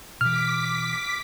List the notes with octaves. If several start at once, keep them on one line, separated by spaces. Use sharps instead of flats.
B2 E3 D6 F6 B6